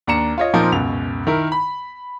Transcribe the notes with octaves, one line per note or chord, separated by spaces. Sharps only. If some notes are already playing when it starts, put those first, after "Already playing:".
D#2 D4 A#5 C#7 E7
F4 C#5 D#5
A#2 F3 A#3 C4 D#4 A#4
C#2 F#2 B2 F7
D#3 E4 A#4
B5